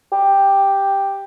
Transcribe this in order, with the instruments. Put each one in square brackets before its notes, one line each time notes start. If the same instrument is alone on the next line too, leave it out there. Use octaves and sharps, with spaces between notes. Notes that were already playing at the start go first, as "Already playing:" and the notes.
[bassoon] G4